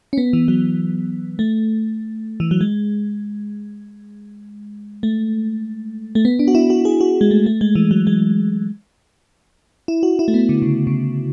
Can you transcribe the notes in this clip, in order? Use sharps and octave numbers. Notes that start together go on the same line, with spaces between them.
C#4
B3
E3
F#3
A3
E3
F#3
G#3
A3
A3
B3
D4
F#4
E4
F#4
G#4
F#4
G#3
A3
A3
G#3
E3
F#3
G#3
E4
F#4
E4
A3
B3
D3
C#3
C#3